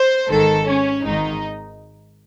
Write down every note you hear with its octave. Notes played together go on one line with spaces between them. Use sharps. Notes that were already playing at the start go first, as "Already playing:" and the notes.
Already playing: C5
G#1 G#2 D#3 A4
C#4
G#1 G#2 D#3 D#4